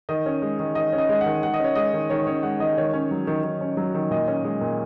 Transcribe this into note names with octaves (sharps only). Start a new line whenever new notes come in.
D#3 D#5
C#4
G#3
D#3
D#3 D#5
C#4
D#5
G#3 D#5
D#3 F#5
D#3 F#5
D#5
C#4 C#5
G#3 D#5
D#3
D#3 C#5
C#4 C#5
G#3 F#5
D#3 D#5
D#3 C#5
C#4
F#3
D#3
D#3
C#4
F#3
D#3
A#2 D#5
C#4
G#3
A#2